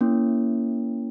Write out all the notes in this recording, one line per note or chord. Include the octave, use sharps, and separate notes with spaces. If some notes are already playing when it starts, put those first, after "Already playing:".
A#3 C#4 E4